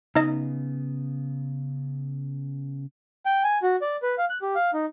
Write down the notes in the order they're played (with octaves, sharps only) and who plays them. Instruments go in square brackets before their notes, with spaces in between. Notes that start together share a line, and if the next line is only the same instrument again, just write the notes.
[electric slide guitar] C#3 B3 [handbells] D#4 D#5
[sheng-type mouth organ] G5
G#5
F#4
D5
B4
F5
F#6
G4
F5
D#4